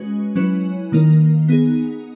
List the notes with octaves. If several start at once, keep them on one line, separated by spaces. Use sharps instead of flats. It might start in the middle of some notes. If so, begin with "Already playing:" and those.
Already playing: G#3 C#4 F#4 B4
F#3 C#4 E4 B4
D#3 A#3 D#4 A#4
B3 D#4 G#4